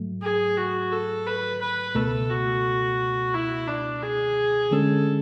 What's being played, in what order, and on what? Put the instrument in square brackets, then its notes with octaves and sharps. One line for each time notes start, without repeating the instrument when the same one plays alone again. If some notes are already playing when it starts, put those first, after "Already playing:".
Already playing: [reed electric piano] G#2 F#3 A3
[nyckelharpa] G#4
F#4
A4
B4
B4
[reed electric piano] C#2 B2 A3 [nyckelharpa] A4
[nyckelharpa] F#4
E4
D4
G#4
[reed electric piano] D3 G#3 C#4 [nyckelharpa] A4